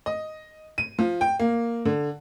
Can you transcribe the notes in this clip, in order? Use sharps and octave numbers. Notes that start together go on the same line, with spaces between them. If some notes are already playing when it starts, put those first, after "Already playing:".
D#5
D#7
F3
G5
A#3
D3